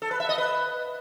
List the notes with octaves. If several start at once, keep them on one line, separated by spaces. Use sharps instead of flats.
A4
B4
E5
D#5
B4